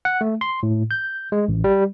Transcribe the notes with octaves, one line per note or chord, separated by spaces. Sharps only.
F#5
A3
C6
A2
G6
G#3
A1
G3